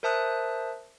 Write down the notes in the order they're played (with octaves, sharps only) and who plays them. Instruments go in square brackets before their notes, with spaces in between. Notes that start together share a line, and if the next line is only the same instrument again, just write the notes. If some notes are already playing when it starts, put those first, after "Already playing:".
[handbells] A#4 C5 E5 A5 D#6 F#6